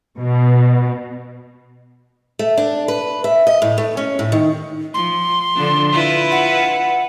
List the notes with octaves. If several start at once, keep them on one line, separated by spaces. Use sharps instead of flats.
B2
A3
D4
B4
E5
D#5
A2
A3
C#4
A2
D#3
F3 C6
D3 F3 D4
E4 F4 B4
F#5